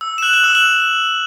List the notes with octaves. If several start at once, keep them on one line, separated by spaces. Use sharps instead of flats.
E6
E7
F#6 F#7
F#6 F#7
E6 E7
F#6 F#7